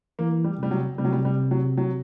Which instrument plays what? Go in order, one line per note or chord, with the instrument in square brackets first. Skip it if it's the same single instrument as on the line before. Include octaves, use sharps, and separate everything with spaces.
[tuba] E3 [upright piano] A#3
[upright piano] G3
[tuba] C3 [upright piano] G3
[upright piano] F#3
[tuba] C3 [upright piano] G3
[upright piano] F#3
G3
G3
F#3
F#3